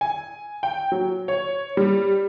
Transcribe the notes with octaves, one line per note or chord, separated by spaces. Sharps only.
G#5
G5
F#3
C#5
G3